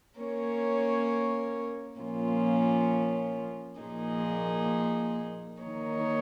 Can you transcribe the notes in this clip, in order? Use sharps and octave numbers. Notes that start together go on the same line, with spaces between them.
A#3 C#4 A#4 C#5
A#2 F3 A#3 C#4 F4
A#2 F3 A#3 D#4 G#4
D#3 A#3 D#4 C#5